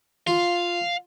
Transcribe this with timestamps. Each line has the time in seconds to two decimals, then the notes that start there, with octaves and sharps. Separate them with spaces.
0.27 F4 F5